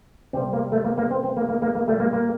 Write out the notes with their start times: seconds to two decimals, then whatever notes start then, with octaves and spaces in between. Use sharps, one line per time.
0.33 C3 G3 C4
0.53 A#3
0.72 A3
0.84 A#3
0.98 A#3
1.11 C4
1.23 C4
1.37 A#3
1.49 A#3
1.62 A#3
1.75 A#3
1.87 A#2 G3 A3
2.00 A#3
2.13 A#3